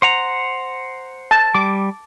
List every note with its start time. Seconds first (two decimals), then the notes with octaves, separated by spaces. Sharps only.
0.02 C5 F#5 A#5
1.31 A5
1.55 G3 D6